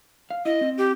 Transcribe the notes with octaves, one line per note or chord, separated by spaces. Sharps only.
F5
E4 D#5
C4
G4